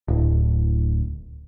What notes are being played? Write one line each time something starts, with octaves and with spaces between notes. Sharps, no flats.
D1